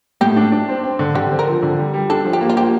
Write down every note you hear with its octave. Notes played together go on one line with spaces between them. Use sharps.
A2 G4
D4
D4
C4
C4
D3
D3 G4
C4
A#4
F3
D3
G3
G3
D4 A4
F3
G4
A#3
F4
F3 G4